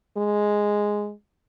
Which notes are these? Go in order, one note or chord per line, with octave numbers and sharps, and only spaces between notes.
G#3